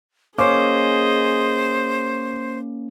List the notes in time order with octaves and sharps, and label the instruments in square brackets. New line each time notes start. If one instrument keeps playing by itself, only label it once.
[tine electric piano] A#3 C#4 [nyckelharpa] G#4 D#5 [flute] C5 [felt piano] C#5 C#6 D6